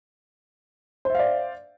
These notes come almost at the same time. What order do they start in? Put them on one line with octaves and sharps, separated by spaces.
C5 E5 F5 D5